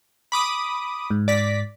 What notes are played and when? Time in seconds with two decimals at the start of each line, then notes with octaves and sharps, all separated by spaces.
0.32 B5 D6 D#6
1.11 G#2
1.28 D5 A#6 B6